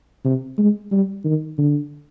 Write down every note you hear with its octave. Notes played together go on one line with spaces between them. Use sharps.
C3
G#3
G3
D#3
D3